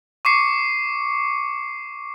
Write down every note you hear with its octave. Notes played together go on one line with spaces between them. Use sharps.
C#6 D6 C7 C#7